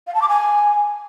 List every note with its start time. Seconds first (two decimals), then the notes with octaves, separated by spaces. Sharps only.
0.07 F5
0.14 A5
0.22 D6
0.29 G#5